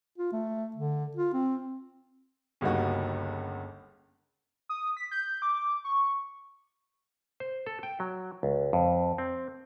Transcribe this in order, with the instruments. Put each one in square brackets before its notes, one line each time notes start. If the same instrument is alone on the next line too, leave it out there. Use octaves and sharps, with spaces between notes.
[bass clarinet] F4
A3
D3
F4
C4
[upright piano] G1 C#2 G3 A#3 D#4 F#4
[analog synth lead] D#6
B6
G6
D6
C#6
[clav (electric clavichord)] C5
A4
G5
F#3
C#2
F2
C4